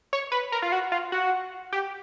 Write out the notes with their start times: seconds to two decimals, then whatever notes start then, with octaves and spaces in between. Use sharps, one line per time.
0.13 C#5
0.32 B4
0.52 A#4
0.62 F4
0.72 F#4
0.92 F4
1.12 F#4
1.72 G4